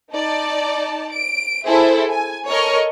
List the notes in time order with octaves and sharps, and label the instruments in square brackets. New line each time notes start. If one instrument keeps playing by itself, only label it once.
[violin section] D#4 D5 A5
D7
E4 G#4 A4 C5 E5
G#5
A4 A#4 C#5 D#5 C#6 F6